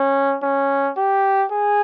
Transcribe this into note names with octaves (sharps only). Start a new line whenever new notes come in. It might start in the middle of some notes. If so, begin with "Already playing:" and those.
Already playing: C#4
C#4
G4
G#4